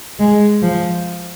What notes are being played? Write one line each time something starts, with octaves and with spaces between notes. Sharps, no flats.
G#3
F3